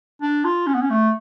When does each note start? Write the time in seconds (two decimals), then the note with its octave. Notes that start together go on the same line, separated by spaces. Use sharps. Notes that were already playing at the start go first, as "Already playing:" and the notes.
0.22 D4
0.45 F4
0.67 C#4
0.74 B3
0.82 C#4
0.90 A3